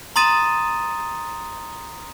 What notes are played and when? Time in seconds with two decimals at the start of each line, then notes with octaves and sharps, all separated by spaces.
0.16 A#5 C6 D#6 A6 D#7 E7